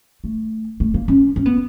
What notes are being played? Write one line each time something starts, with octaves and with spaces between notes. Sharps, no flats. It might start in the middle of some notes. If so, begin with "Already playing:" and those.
A3
A3
A#3
C#4
C#4
B3